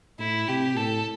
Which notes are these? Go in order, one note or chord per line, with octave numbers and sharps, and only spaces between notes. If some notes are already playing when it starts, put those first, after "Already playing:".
A2 E4
C3 G4
A2 A4